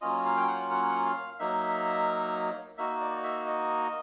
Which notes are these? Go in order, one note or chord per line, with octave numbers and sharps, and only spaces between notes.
F#3 A#3 C#4 F4 D#5
F5
G5
F#5
F#5
F5
F#3 A#3 D#4 E5
A#3 D#4 F#4 E5
D5
E5
D#5